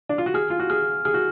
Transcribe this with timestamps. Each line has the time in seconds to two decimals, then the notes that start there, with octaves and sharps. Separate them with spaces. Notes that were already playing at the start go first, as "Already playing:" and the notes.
0.09 D4
0.18 F4
0.26 F#4
0.34 G#4 F6
0.50 F4
0.60 F#4
0.70 G#4 F6
1.05 G#4 F6
1.14 F#4